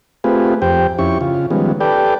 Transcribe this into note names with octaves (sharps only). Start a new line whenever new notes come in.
A3 C4 F4 G4 G#4 B4
F2 G4 C5 G5
F2 C#4 E4 G4 C#6
C#3 F4
D#3 F3 G3 G#3 B3 C#4
G4 A4 B4 D5 G5